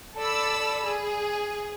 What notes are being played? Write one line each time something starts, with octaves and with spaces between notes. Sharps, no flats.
A4 D5 B5 E6
G#4